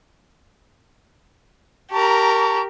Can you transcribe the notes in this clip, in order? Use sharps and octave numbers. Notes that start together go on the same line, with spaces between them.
G4 A#4 A5 A#5 C#6